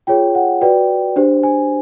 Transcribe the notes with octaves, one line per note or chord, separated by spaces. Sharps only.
F4 G#4 C#5 G5
F#5
F#4 B4 D5 G5
D4 G4 C5
G#5